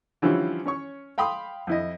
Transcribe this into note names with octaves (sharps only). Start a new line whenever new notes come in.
D3 E3 F3 G3 C#4 F4
C#4 C#5 C#6
F5 G5 B5 C6 D#6
F2 E4 D#5